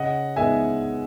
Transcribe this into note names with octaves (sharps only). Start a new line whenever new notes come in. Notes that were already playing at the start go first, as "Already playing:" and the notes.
Already playing: C#3 D#5 F#5
G#3 B3 D#4 E5 G#5